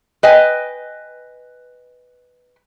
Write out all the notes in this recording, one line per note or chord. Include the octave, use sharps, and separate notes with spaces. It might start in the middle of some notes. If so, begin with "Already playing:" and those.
B4 D#5 G5 G#5